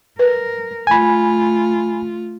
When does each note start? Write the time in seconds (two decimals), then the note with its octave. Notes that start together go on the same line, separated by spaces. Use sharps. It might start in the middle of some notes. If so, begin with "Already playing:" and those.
0.19 A#4 B4
0.87 A3 F4 G#5 B5